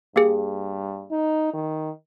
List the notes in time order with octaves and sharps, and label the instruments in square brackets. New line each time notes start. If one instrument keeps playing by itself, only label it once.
[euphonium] G2 [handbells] A#3 G4 G#4
[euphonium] D#4
D#3